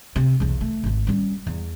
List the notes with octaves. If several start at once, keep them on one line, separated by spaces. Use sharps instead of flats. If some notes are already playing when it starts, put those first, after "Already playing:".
C3
B1 E2
A3
G#1 F#3
G3 C#4
E2